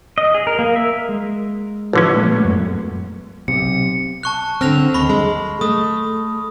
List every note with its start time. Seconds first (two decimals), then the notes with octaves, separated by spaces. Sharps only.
0.18 D#5
0.34 G#4
0.47 A#4
0.59 A#3
0.76 E5
1.09 G#3
1.93 A1 D3 F3 C#4
2.15 A#2 G#3 A3 B3
2.45 F#2
3.48 B1 C3 C#7
4.23 A5 C#6 F#6
4.61 D3 C4 F6 A#6 F7
4.94 D#2 B5 C#6 A#6
5.10 G#3
5.61 A3 D#6